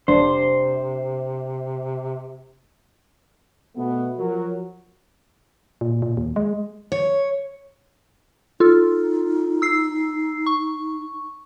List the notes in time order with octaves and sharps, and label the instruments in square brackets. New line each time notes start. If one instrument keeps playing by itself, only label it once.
[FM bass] F1 [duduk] C3 [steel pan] D4 [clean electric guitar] C5
[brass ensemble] B2 A3 B3
F3 F#3 F#4 A#4
[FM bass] A#2
A#2
D#2
G#3
[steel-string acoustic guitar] C#5
[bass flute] D#4 [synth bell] F4 A4
[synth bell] E6 C7
C#6